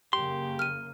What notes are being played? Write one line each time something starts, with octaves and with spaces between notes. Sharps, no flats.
F#2 C#3 A#3 G4 C6
F6 D#7